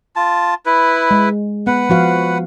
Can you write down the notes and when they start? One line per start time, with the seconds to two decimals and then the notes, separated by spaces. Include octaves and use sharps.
0.16 F4 A5
0.66 E4 B4
1.11 G#3
1.67 B3 B4 F#5
1.90 F3 F#4 F5